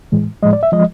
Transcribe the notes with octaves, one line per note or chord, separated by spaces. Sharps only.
A2 E3 G#3
A2 F3 G#3 D#5
D5
E5
F3 G#3 D#5